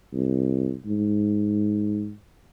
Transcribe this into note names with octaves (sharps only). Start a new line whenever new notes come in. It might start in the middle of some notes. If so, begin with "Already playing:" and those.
C2
G#2